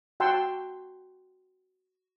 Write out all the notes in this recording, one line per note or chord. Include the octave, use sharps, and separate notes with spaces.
F#4 F#5 G5 A5 C6 E6